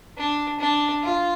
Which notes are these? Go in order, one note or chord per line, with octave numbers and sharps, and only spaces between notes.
D4
D4
F4